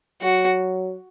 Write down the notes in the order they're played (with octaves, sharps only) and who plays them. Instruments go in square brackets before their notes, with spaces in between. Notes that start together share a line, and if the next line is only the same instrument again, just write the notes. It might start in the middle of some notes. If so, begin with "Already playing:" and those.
[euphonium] F#3 [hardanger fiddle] F#4